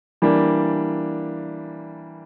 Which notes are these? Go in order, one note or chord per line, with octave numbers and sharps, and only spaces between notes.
E3 G3 A#3 D4